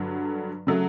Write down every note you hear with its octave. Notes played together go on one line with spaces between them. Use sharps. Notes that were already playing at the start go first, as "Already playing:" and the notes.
Already playing: G2 D3 F#3
C#3 F#3 A3